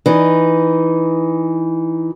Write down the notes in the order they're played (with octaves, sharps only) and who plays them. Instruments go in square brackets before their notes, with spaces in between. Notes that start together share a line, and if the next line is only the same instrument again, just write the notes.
[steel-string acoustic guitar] E3 D#4